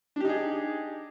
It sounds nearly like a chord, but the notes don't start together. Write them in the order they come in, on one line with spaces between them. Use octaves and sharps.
D4 G4 D#4 G#4